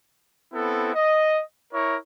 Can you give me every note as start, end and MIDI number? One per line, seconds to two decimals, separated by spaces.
0.52 0.89 59
0.52 0.89 60
0.52 0.89 64
0.52 0.89 69
0.94 1.41 75
1.72 1.96 64
1.72 1.96 70
1.72 1.96 73
1.72 1.96 85